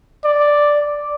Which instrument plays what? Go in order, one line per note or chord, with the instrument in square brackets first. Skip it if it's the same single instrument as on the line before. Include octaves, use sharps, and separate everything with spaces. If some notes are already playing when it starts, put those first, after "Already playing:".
[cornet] D5